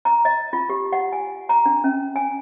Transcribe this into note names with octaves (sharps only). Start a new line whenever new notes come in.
A#5
D#5
F4
G4
F#5
G#5
A#5
D4
C#4
G#5